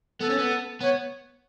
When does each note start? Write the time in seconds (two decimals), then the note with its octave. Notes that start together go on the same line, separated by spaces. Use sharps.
0.20 B3 A4
0.29 C#4
0.38 B3
0.81 B3 C#5